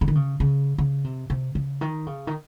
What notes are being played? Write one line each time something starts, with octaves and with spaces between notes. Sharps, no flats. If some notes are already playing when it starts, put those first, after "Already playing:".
C#3
D#3
C#3
C#3
C#3
C3
C3
C#3
D#3
C#3
D#3